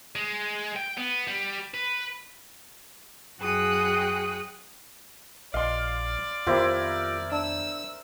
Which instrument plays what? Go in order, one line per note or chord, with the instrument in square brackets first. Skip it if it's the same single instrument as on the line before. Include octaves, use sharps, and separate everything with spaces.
[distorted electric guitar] G#3
G5
B3
G3
B4
[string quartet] F#2 F#4 G#4 G5 D#6 F#6
[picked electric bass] A#1 [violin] D5 [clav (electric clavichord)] D#5 [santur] F5 C6
[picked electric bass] F2 D#3 B3 [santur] E4 A#4 C5 [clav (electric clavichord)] F4 G4
[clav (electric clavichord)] D4 [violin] E6